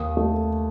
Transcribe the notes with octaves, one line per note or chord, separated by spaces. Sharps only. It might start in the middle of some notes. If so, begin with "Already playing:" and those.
Already playing: D#2 D#6
A3